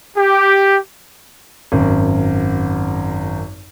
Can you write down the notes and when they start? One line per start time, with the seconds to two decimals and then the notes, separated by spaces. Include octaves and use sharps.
0.17 G4
1.72 G#1 F#2